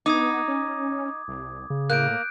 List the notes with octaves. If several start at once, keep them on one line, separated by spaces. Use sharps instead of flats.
B3 D#4 D6 D#6 G#6
C#4
C2
C#3
A2 A#3 F#6 G6 D7